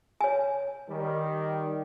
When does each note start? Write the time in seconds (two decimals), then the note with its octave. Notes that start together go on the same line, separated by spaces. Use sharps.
0.21 C#5 G#5
0.90 D#3 G3